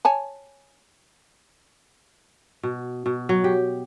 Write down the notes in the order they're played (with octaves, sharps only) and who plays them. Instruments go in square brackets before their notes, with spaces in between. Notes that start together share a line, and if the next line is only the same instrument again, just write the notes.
[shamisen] C#5 G#5 A5
[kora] B2
B2
F#3
G4